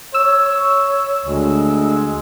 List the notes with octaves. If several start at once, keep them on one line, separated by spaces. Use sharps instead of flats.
C#5 E6
D2 G#3